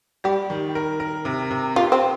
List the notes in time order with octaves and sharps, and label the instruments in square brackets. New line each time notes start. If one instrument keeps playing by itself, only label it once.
[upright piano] G3 [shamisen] G4
[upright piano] D#3
A#4
A#4
C3
C3
[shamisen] F4 [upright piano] G4
[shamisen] C4